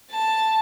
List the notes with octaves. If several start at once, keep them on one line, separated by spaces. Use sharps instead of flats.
A5